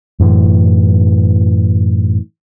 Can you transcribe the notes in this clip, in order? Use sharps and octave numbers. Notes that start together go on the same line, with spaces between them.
F#2 A2 E3